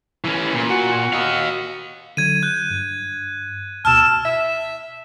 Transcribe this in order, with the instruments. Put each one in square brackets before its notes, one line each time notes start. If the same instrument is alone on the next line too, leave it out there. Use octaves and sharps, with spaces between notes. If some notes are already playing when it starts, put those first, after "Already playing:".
[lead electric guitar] E3 C#4
A#2
[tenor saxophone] F#4
[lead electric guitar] D#5 F5
[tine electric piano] D3 F#3 [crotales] G#6 D#7
[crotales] F#6 [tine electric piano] G6
[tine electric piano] G2
[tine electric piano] D2 B2 [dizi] A5 [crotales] E6 F6
[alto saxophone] E5